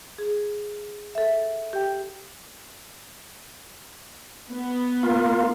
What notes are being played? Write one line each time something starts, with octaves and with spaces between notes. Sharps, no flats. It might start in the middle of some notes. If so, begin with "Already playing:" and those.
G#4
A4 E5
G4 G5
B3
A#3 F4